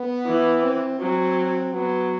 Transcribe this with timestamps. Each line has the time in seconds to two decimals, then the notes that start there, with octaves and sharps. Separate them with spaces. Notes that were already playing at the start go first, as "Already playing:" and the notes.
Already playing: B3
0.26 E3
0.63 C4
1.00 F#3 C4
1.74 F#3 B3